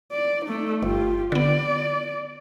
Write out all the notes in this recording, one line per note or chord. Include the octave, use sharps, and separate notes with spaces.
D5
A3 D#4
G1 F4 G4
D3 B3 D5